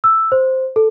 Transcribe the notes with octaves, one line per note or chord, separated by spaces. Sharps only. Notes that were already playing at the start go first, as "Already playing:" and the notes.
E6
C5
A4